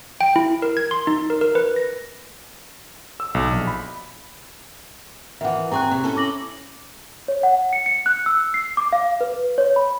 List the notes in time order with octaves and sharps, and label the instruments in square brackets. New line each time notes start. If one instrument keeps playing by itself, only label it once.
[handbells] G5
E4
A#4
G#6
C6
D#4
A#4
A#4
B4
A#6
[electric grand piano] E6
B1
A#1
B5
[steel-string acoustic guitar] D#3 E3 [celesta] E5 F#5
[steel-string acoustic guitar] C4 G#4 G#5 [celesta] A#5 C#6 F#6
[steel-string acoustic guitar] C3
C#4 E4 A4
[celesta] D6 A#6 F#7
C#5
F#5
C#7
C#7
F#6
E6
C7
D6
F5
B4
C#5
B5